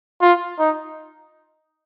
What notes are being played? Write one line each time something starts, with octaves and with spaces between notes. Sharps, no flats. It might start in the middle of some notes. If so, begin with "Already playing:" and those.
F4
D#4